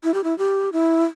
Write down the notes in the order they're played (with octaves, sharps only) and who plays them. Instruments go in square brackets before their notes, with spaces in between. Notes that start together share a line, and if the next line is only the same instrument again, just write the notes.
[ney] E4
G4
E4
G4
E4